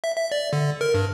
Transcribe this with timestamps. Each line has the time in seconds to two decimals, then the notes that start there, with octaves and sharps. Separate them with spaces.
0.04 E5
0.16 E5
0.32 D5
0.53 D3
0.81 A#4
0.94 G2